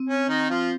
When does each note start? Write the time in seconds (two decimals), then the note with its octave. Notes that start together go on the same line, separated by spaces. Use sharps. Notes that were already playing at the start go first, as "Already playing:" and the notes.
Already playing: C4
0.09 C#4
0.29 D#3 D#4
0.50 F3 F4